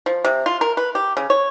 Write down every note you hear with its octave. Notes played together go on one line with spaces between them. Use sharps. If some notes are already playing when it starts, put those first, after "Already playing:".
F3
C3
F4
A#4
B4
G4
C#3
C#5